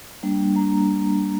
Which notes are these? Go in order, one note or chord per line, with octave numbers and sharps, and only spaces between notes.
G3 A#3 D4
G3 A#3 D4 A#5